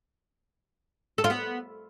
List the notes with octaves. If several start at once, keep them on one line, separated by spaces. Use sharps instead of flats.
A4
F4
B3